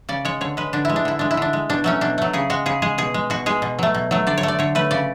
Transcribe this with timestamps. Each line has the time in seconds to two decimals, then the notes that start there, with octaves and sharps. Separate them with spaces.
0.09 C#3 D5
0.25 G#3 C#5
0.41 D3 C#5
0.57 G#3 B4
0.73 D3 D4
0.85 G#3 E4
0.96 D4
1.05 D3 E4
1.19 G#3 D4
1.31 E4
1.37 D3 D4
1.53 G#3
1.69 B2 D4
1.84 F#3 A3 C#4
2.01 B2 D4
2.18 F#3 A3
2.33 C#3 G#4
2.50 G#3 F#4
2.66 C#3 G#4
2.82 G#3 G#4
2.98 B2 G#4
3.14 G#3
3.30 B2 F#4
3.46 G#3 G#4
3.62 B2
3.79 F#3 A3
3.94 B2
4.11 F#3 A3
4.27 D3 D5
4.38 C#5
4.43 A3
4.48 D5
4.59 D3 C#5
4.75 A3 B4
4.91 C#3 D5